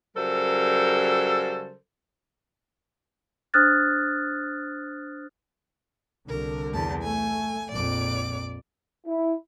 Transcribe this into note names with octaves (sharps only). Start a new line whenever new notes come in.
C#3 F#3 G3 A4 A#4 C5
D4 C5 D#6 F6 F#6 A6
C2 D3 A#4
E2 A5
A3 G#5
A#1 F2 A#2 D5 D6
E4